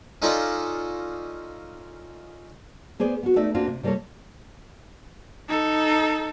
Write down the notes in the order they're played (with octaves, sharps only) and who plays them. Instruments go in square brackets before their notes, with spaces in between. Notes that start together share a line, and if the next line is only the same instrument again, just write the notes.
[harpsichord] C#4 D#4 F4 A4 D5 D#5
[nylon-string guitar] B3 G#4 C5 D5
B3 F#4
A3 D#4 D5 E5
A#3 C4 D4 F4 F#4
C3
C3 G3 A#3 A4 C#5
[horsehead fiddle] D#4 A4